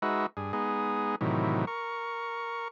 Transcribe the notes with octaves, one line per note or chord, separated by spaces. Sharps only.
G#3 D#4 F#4 B4 E5
G2 G#4
G#3 B3 D#4 G#4
A2 C3 D#3 E3 F#3
A#4 C#6